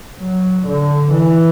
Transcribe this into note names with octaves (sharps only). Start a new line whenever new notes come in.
F#3
D3
E3